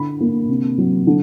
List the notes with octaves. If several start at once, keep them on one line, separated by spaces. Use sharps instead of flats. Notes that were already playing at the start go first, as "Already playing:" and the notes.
Already playing: D3 B5
A#3
C3
F#3
D3